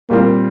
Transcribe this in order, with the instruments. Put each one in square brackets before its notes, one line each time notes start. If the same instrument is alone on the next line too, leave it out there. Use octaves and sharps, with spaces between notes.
[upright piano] A#2 G3 C4 F4 [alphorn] A#3